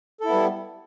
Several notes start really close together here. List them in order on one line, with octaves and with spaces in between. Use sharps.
A4 E4 B3 G3